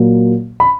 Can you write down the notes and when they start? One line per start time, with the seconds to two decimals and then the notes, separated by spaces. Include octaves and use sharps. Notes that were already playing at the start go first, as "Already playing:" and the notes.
Already playing: A#2 F#3 A#3
0.60 B5